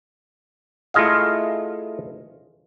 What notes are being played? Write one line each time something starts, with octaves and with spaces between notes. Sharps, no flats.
A3 E4 F4 G#4 D#5 F5